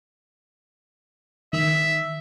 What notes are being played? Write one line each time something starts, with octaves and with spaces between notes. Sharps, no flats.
D#3 E5